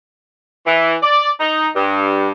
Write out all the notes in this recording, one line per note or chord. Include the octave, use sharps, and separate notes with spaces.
E3
D5
D#4
G2